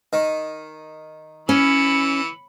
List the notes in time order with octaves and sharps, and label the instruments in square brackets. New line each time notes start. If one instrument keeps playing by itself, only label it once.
[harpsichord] D#3
[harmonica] E3 [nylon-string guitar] C#4 [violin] B5 C#7